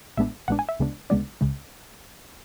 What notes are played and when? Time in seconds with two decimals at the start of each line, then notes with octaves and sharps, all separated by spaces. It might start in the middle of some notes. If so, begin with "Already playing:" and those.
0.17 A1 A2 G#3 B3 D4 E5
0.48 A1 A2 G#3 B3 D4 F#5
0.59 G#5
0.69 E5
0.79 D2 C#3 G#3 B3 D4
1.10 D2 C#3 G#3 B3 D4 D5
1.41 C#2 C#3 G#3